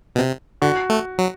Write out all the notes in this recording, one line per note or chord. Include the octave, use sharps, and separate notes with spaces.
B2
C3
D3 F#4
A3
F#3